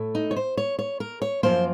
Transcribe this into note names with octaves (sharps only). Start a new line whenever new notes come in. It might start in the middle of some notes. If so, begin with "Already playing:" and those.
Already playing: A2 A3
D#4
C#5
C5
C#5
C#5
A#4
C#5
F#2 F3 A#3 C5